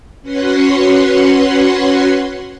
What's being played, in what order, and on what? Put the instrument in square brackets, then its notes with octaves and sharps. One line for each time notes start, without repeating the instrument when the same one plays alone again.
[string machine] C#4 F#4 B4 C#5 F#5 C6